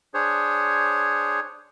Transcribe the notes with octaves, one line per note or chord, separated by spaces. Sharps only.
D4 G#4 C5 C#5